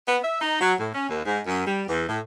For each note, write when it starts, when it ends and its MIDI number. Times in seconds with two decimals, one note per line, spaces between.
0.08 0.18 59
0.23 0.37 76
0.41 0.60 63
0.61 0.73 54
0.80 0.90 45
0.94 1.09 61
1.09 1.20 39
1.25 1.39 44
1.46 1.66 42
1.67 1.82 55
1.88 2.08 40
2.08 2.19 45